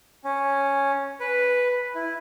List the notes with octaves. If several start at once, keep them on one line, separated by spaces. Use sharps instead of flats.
C#4
B4
E4